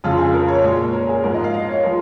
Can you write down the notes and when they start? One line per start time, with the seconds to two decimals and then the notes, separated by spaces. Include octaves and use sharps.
0.04 F2 C#3 G#3 F4
0.18 G#4
0.34 A#4
0.48 C#5
0.64 A#2 G#3
0.93 A#4
1.09 G#4
1.24 G#2 F3 G#3 A#4
1.34 D#5
1.44 F5
1.54 D#5
1.69 C#5
1.83 F3 G#3 A#4